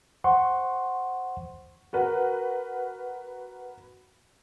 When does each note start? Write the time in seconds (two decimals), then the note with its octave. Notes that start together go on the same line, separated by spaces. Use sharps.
0.24 C5 F#5 C6 C#6
1.93 F#4 A#4 B4